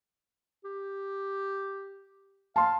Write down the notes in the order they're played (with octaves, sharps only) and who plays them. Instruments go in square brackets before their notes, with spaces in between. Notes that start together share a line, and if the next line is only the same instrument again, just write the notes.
[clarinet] G4
[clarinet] F5 [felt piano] A5 C6